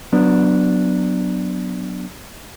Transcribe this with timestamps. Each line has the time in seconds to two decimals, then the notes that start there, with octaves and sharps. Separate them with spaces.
0.12 F#3 B3 D4